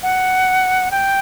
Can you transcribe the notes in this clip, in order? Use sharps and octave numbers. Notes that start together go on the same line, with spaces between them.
F#5
G5